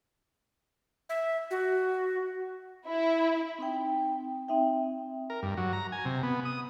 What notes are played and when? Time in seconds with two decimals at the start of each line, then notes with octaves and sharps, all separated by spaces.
1.09 E5
1.51 F#4
2.88 E4
3.58 C4 D#4 G5
4.48 C4 D#4 E5 G5
5.30 A#4
5.43 G2
5.57 F#3
5.73 A#5
5.92 G#5
6.05 C3
6.23 B3
6.45 D#6